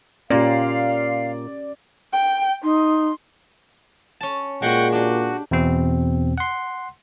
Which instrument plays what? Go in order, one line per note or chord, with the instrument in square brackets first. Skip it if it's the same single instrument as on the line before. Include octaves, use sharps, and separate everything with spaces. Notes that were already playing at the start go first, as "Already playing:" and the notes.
[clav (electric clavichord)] A#2 A#3 [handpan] C#4 G4 [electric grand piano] D5 [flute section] F5 C6
[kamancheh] G5
[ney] D#4 [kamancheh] C6
[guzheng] C#4 A5
[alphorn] A#2 [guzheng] G#3 F#4 [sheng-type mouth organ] F#5 G5
[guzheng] D4 G4 [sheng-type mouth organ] F#4
[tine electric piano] E2 B2 C4
F#5 C6